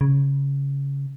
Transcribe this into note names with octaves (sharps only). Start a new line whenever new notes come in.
C#3